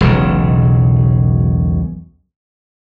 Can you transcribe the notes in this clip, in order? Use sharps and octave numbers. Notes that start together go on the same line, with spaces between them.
E1 B1 C#3